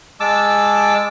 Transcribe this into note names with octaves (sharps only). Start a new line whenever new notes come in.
G#3 A5 D6 E6